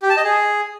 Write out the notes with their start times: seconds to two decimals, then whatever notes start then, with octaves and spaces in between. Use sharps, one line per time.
0.02 G4
0.10 A5
0.17 D#5
0.24 G#4